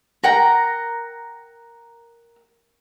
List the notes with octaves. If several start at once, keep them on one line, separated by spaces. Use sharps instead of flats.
A#4 F#5 G5 A#5